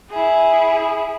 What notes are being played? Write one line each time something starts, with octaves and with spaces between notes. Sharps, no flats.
E4 G#4